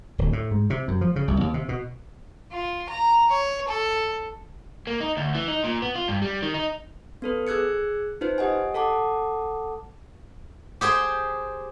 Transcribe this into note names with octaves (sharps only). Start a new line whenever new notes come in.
D1
A2
G#2
C3
F#2
F3
C#3
C2
D#2
C3
B2
F4
A#5
C#5
A4
A#3
D#4
D2
E3
D#4
A#2
B3
F4
G2
G3
D#3
D#4
B3 A4 B4
G#4 E6 F#6 G#6 C#7
D#4 F4 B4 C5
G4 D#5 F#5 G#5
A4 F#5 A5 D6
G4 G#4 C5 G5